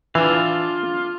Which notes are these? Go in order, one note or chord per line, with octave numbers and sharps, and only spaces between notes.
E3 D4 F4 F5